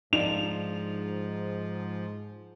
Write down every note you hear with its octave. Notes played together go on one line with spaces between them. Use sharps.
G#2 F3 D4 D#4 F4 F7